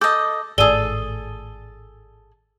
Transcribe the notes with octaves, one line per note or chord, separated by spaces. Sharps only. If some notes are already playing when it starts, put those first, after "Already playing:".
A4 D#5 D6 G6
G#1 A2 G#4 A4 D5 E6 D#7 G7